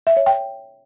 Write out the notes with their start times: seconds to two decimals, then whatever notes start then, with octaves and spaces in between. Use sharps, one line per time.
0.07 E5
0.17 C#5
0.26 G5